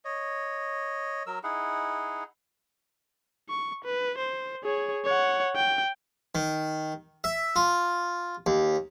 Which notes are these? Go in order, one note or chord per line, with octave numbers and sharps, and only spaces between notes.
C#5 D#5
F#3 A#4 E6
D#4 E4 G#4 F#5
C#6
B4
C5
G#4 C#5
C#5 F#5
G5
D#3
E5
F4
D#2